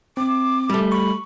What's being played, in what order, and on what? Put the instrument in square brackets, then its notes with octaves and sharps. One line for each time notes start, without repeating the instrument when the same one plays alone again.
[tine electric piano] C4 [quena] D6
[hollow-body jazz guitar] G3 A3
[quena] B5 [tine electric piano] C#6